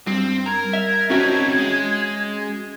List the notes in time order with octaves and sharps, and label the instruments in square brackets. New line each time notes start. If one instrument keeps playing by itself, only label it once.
[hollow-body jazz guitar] G2 [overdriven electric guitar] C4
[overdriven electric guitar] A#4 [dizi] G#6
[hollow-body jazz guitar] E5
[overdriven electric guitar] C4 D#4 [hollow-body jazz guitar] C#4 F#4 E5
[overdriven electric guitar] G#3